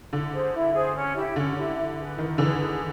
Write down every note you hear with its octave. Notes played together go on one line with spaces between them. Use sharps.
D3 E4
G#4 C5
E4
G#4 C5
C#4
E4 G4
D3 C#4
E4 G4
E4
G#4 B4
D#3 E4
D3 E3 G#4 B4
G#4